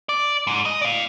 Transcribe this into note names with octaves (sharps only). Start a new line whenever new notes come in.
D5
G#2
D#5
D5 F5